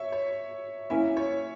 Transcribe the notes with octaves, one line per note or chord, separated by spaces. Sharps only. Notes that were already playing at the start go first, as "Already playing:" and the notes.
Already playing: C#5 E5
C#5
A#3 C#4 E4 E5
C#5